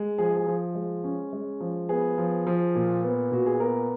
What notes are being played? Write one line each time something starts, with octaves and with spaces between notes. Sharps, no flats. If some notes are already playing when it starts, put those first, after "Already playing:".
Already playing: G#3
F3 G#4
G#4
F3
G#3
C#4
G#3
F3
B3 G#4
F3
F3
A#2
B3
A#2 F#4
G#4
B3 A#4